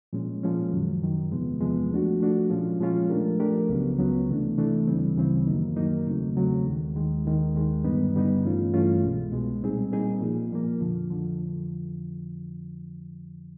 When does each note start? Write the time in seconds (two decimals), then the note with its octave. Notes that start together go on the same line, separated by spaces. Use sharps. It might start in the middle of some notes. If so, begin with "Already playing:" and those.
0.13 A#2 F3 G#3 C#4
0.43 A#2 F3 G#3 C#4
0.72 F#2 D#3 F#3
1.02 F#2 D#3 F#3
1.32 E2 C3 F3 G#3 B3
1.61 E2 C3 F3 G#3 B3
1.92 F3 A3 D4 F#4
2.20 F3 A3 D4 F#4
2.50 A#2 F3 G#3 C#4 F4
2.80 A#2 F3 G#3 C#4 F4
3.10 F3 A3 D4 G4 A#4
3.39 F3 A3 D4 G4 A#4
3.69 C#2 C#3 F#3 B3
3.99 C#2 C#3 F#3 B3
4.29 C3 E3 A3 D4
4.58 C3 E3 A3 D4
4.87 D2 C#3 E3 G3 C4
5.17 D2 C#3 E3 G3 C4
5.47 F#2 D#3 F#3 A#3 D#4
5.76 F#2 D#3 F#3 A#3 D#4
6.06 E2 C#3 F#3 A3 C4
6.36 E2 C#3 F#3 A3 C4
6.66 D#2 D#3 G#3
6.96 D#2 D#3 G#3
7.25 D#2 D#3 G#3
7.54 D#2 D#3 G#3
7.84 G2 D3 G3 B3 D#4
8.14 G2 D3 G3 B3 D#4
8.43 G2 E3 A3 C#4 F4
8.74 G2 E3 A3 C#4 F4
9.03 C2 B2 G#3
9.32 C2 B2 G#3
9.62 A#2 G3 C4 D#4 G#4
9.92 A#2 G3 C4 D#4 G#4
10.21 A#2 F3 A#3
10.52 A#2 F3 A#3
10.81 F2 D3 F3
11.10 F2 D3 F3